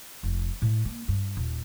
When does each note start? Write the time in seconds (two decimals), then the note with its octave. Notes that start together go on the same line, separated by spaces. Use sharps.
0.23 F1
0.62 A2
0.85 A#3
1.08 G2
1.37 D#1